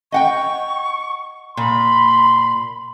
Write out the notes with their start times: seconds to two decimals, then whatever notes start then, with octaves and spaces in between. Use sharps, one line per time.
0.12 D#5 F#5 G5 C#6
1.57 A#2 B5 C6